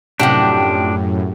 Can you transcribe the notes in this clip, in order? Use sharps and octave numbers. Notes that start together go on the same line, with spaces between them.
F#2 A2 C3 F3 D4 G4 F#5